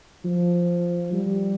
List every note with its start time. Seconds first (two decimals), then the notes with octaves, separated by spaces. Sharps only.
0.25 F3
1.13 G3